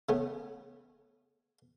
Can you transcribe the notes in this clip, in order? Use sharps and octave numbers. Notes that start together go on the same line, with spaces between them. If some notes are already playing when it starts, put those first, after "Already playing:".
C#3 A3 B3